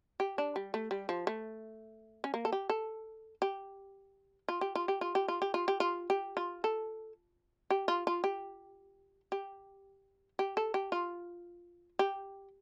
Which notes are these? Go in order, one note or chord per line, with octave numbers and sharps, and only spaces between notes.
G4
D4
G3
A3
G3
F3
A3
C#4
A#3
A4
G4
A4
G4
F4
G4
F4
G4
F4
G4
F4
G4
F4
G4
F4
G4
F4
A4
G4
F4
F4
G4
G4
G4
A4
G4
F4
G4